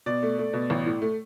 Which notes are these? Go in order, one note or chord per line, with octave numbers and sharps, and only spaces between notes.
B2 D5
A3
A3
B2
A1
A2
A3